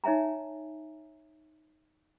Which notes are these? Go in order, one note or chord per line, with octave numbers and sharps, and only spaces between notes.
D#4 C#5 E5 G#5 A#5